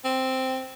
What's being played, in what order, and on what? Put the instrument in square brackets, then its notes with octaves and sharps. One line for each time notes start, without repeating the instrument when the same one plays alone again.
[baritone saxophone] C4